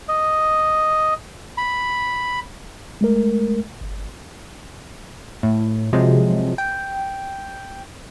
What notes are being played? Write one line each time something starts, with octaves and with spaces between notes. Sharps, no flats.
D#5
B5
G#3 A3 A#4
G1
A2
C3 F3 F#3 G#3
G5